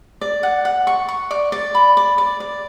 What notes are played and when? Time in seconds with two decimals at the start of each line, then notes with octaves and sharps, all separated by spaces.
0.21 D5
0.43 F#5
0.65 F#5
0.87 C#6
1.09 C#6
1.31 D5
1.52 D5
1.75 B5
1.97 D5
2.18 D5
2.40 D5